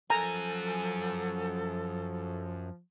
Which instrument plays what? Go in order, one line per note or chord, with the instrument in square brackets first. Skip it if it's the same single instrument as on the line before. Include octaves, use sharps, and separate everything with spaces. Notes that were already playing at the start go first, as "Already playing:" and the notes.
[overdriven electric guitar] F#2 G#5 [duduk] F3 [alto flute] A4 [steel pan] A#5